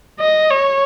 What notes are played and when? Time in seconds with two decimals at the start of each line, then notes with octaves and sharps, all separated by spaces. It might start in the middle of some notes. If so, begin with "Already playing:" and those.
0.20 D#5
0.50 C#5